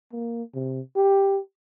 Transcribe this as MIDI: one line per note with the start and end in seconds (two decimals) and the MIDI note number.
0.12 0.43 58
0.55 0.80 48
0.96 1.39 67